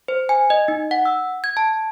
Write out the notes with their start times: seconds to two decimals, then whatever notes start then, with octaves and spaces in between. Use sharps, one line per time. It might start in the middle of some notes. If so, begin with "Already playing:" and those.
0.08 C5
0.29 G#5
0.50 D#5
0.68 D#4
0.91 F#5
1.06 E6
1.44 G#6
1.57 A5